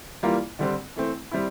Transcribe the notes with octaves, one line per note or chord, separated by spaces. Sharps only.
E3 G3 A#3 F4
D3 G3 C4
E3 A3 C4
G3 C4 E4